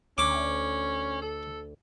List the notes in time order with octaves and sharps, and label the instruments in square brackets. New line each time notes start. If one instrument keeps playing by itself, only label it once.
[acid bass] D2 [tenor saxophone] C#4 [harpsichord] D6
[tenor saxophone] A4